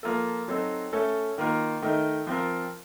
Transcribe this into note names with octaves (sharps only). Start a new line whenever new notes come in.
F3 A#3 F4 A4
F#3 C4 D#4 A4
A3 C#4 A4
D#3 A#3 F4 A#4
D#3 A3 D#4 A#4
F3 C4 F4 A#4